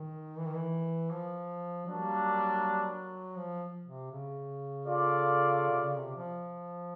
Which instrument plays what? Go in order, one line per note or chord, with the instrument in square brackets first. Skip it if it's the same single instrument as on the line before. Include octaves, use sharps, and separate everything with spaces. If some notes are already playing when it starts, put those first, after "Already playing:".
Already playing: [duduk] D#3
E3
D#3
E3
F3
[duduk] F#3 [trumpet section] G3 A#3 D4
[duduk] F3
C3
C#3
[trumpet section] F4 A4 D5 F5
[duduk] C3
C#3
C3
F3